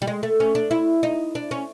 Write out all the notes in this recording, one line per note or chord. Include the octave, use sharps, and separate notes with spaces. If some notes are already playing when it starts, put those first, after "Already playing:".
G3
G#3
A3
C#4
D4
E4
D#4
D4
C#4